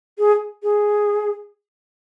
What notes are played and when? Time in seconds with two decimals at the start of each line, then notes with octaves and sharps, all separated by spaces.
0.19 G#4
0.63 G#4